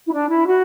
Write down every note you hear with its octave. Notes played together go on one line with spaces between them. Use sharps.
E4
D4
E4
F#4